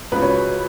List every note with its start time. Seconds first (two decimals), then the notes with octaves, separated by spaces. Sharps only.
0.12 C#2 C#3 F#3 B4
0.22 C#5